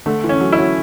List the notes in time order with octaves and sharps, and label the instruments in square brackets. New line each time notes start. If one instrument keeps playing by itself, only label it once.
[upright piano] D3 [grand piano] A3
[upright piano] E3
[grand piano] C#4
[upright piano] F#3
[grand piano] E4
[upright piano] F#3